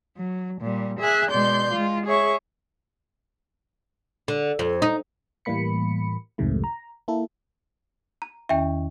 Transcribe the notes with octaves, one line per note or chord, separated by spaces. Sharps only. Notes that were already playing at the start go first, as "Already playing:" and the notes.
F#3
A#2 G3
G#4 E5 G#5 F#6
B2 G#3 D5 C6 G6
G#3 F4
G#4 C#5 E5 C#6
D3
F2
D#4
A2 E3 G3 A#3 B5 C#7
C2 F2 G#2 C3 D#3 A3
A#5
A#3 E4 A4
A#5
E2 D#3 C#4 E5 G5